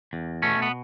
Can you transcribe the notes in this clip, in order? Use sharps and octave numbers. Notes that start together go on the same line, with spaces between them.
E2
B2 A3 C#4
B3